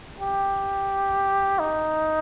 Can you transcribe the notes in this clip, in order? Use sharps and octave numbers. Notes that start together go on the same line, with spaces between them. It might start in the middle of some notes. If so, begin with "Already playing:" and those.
G4
D#4